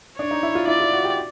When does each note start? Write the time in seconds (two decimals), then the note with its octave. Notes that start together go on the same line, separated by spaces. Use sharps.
0.19 D4 C#5
0.31 D#4
0.43 E4
0.55 F4
0.68 E4 D5
0.80 F4
0.93 F#4
1.04 G4